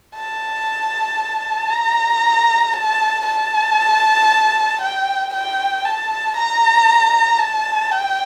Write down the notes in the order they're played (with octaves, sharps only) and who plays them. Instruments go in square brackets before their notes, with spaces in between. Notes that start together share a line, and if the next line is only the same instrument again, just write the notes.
[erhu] A5
A#5
A5
A5
G5
G5
A5
A#5
A5
G5